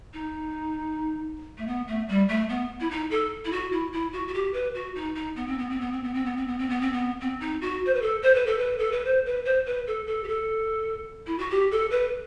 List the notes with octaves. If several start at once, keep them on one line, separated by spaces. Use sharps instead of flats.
D#4
A3
B3
A3
G3
A3
B3
E4
D#4
A4
E4
F#4
E4
E4
F#4
F#4
G4
B4
F#4
D#4
D#4
B3
C4
B3
C4
B3
C4
B3
C4
B3
C4
B3
C4
B3
C4
B3
C4
D#4
F#4
C5
B4
A4
C5
B4
A4
B4
A4
B4
C5
B4
C5
B4
A4
A4
G4
A4
E4
F#4
G4
A4
B4